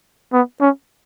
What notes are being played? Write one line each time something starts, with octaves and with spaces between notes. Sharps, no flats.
B3
C#4